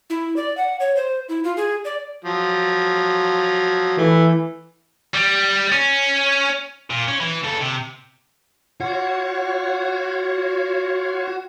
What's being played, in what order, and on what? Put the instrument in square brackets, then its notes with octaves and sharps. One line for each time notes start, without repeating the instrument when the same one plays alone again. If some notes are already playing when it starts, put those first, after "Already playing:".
[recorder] E4
D5
F#5
C#5
C5
E4
F4
G#4
D5
[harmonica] F3 F#3
[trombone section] E3 [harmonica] A3
[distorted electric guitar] G3
C#4
A#2
C#4
E3
C#3 A4
C3
[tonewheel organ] F4 C#5 [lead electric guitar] F#4